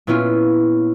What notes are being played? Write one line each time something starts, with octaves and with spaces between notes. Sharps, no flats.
A#2 B3 C#4 E4 F4